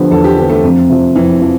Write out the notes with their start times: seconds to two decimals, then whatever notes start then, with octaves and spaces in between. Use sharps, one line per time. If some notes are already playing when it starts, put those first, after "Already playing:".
Already playing: D3 F3 B3 G4
0.11 E2 A4
0.24 G4
0.37 D3 F3 B3 G4
0.49 A3
0.63 F2 C3
0.89 C3 F3
1.15 F2 E3
1.41 F3